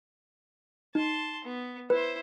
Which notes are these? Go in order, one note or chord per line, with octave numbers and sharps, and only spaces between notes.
D#4 A5 C6
B3
E4 B4 C5